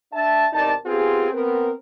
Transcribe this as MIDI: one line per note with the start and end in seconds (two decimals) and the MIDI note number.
0.12 0.44 62
0.12 0.44 76
0.12 0.44 81
0.53 0.73 40
0.53 0.73 48
0.53 0.73 63
0.53 0.73 70
0.53 0.73 74
0.53 0.73 81
0.85 1.31 59
0.85 1.31 60
0.85 1.31 65
0.85 1.31 67
0.85 1.31 68
1.32 1.70 59
1.32 1.70 60
1.32 1.70 70